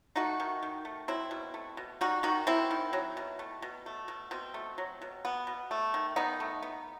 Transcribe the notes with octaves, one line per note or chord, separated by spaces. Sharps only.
A3 D#4 F#4
D#3
D#3
A3
F#3 C4 E4
B2
A3
B2
G3 D#4 F#4
D#3 D#4 F#4
B3 C4 E4
D#3
F#3
B2
A3
B2
A3
B2
B2 C4
A3
F#3
B2
B3
B2
A3
D#3
D#3 B3 D#4
A3
B3